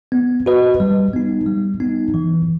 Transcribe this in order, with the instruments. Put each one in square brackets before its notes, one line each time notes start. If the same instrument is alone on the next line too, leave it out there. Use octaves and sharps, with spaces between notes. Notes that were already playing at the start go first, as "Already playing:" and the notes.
[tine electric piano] B3
F#4 B4 D#5
G3
B3 D#4
G3
B3 D#4
E3